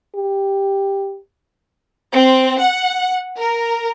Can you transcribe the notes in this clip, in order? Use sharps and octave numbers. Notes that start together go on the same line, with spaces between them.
G4
C4
F#5
A#4